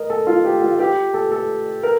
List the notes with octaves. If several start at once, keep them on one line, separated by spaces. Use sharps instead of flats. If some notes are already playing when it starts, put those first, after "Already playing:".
Already playing: A#4 D#5
A4
F4
G4
F4
G4
A4
A4
A#4